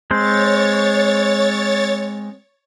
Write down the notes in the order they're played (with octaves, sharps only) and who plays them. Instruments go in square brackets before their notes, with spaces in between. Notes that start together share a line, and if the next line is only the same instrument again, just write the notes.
[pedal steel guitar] G#3 C4 C5 [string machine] C#5 A6